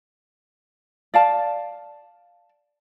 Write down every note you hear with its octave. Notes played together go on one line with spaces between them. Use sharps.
D5 F5 A5